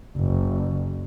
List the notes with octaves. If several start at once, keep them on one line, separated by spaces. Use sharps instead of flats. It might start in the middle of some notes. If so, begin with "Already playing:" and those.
F#1